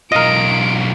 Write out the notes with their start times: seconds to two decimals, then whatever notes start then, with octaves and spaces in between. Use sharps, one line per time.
0.12 B1 F4 A#4 D#5 D7